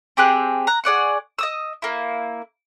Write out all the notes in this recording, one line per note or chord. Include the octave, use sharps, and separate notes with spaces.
C4 G4 G#4 F#6
A#5 F#6
G#4 D5 F#5 C#6
D#5 D#6 E6
A#3 E4